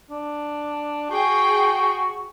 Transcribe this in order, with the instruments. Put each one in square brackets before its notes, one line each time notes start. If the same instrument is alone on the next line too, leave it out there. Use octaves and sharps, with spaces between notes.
[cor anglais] D4
[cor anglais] F#4 [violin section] G#4 G5